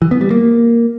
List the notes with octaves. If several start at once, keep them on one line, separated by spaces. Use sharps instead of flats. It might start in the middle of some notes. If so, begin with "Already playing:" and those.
E3
B3
G3
A#3